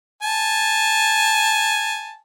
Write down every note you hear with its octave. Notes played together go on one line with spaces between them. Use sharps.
G#5 A5